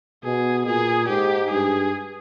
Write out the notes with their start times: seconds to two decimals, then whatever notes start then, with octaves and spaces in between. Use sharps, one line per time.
0.24 B2 G#4
0.66 A#2 G#4
1.09 G#2 G4
1.51 G2 G#4